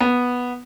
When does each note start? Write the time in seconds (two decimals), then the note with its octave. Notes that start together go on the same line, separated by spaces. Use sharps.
0.01 B3